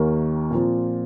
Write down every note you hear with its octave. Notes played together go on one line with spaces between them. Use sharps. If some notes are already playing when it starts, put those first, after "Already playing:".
Already playing: D#2 D#3 A#3
A#2 F3 C4